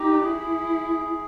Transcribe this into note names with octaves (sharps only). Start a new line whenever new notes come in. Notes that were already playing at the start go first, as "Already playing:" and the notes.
Already playing: D#4 G4
E4 G#4